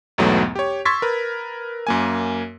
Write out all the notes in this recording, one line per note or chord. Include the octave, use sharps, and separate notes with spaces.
B1 E2 G#2 F#3 A3 B3
G4 C#5
C6 C#6 E6 G#6 A6 B6
A#4 B4
F#2 A#3 G#5